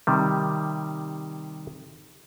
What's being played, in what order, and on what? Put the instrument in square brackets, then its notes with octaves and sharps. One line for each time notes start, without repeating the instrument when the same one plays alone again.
[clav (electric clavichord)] C3 D#3 G3